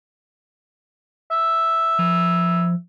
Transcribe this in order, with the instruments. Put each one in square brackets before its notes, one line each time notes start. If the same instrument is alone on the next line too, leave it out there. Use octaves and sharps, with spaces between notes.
[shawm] E5
[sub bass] F3